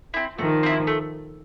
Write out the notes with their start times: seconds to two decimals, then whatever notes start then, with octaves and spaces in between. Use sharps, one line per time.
0.14 C4 E4
0.38 D#3 F3 A3
0.63 C4 E4
0.87 A3